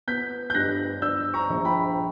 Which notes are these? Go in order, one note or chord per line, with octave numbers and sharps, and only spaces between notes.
B3 G6 B6
G6
G2 F#6 A#6
D4 E6 G6
A#5 C#6
A#1
G5 B5